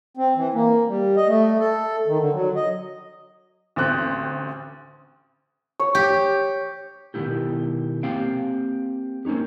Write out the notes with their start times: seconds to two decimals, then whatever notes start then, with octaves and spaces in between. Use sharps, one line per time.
0.17 C4
0.36 E3
0.54 A#3
0.88 G3
1.16 D#5
1.28 A3
1.59 A4
2.06 D#3
2.19 D3
2.33 F#3
2.56 D#5
3.76 A1 D2 C4 F#6
5.80 C#5 C#6
5.95 G4
7.14 B2 D#3 F3 B3 E4 G4
8.03 A#3 C4 G4 F5 G5
9.25 A#3 C4 C#4 D#4 G4